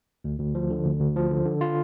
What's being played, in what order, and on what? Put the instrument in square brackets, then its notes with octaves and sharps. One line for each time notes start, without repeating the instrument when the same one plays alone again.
[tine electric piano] D2
D2
F3
D3
D2
D2
F3
D3
D3
F4